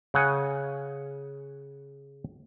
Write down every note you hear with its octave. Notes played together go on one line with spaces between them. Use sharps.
C#3 F#5 G#5